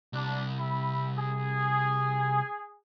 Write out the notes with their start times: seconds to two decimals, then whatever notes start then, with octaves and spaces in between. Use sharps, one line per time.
0.13 C2 D4
0.58 E5 B5
1.16 G#4